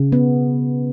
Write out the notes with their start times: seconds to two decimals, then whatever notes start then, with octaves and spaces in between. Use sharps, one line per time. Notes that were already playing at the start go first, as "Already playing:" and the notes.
Already playing: C#3
0.12 B3